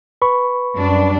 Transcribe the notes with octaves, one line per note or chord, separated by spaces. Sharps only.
B4 B5 C#6
F#2 G3 D4